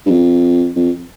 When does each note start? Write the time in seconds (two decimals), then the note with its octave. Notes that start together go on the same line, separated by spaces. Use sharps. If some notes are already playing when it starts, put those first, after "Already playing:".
0.06 G2
0.11 F2
0.76 F2